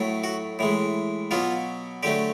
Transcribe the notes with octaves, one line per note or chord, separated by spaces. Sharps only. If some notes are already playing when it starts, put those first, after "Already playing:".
Already playing: A2 F#3 A3
F#4
A2 E3 G#3
B2 F#3 B3 F4
D3 F#3 A3 G4